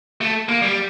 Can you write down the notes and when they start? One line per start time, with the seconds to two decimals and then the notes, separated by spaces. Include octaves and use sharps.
0.21 A3
0.49 A#3
0.62 G3